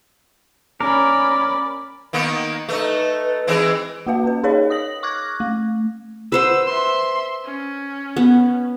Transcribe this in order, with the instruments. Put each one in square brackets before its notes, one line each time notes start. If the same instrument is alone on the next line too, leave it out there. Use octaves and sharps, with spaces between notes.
[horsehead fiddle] C#4 B5 [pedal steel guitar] A#4 [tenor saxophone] D5
[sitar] D#3 A#3 B3
[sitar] A3 D#4 [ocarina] B4
[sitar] E3 G#3 C4
[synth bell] A#3 F#4 B4 F5
C#4 B4
D#4 G#4 A#4 C#5 D#5 F5
D#6 A#6 F#7
C#6 D6 F6 F#6 G#6 A#6
A3
[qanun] B4 C5 F#5 [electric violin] E6
[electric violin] E5 C6
C#4
[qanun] B3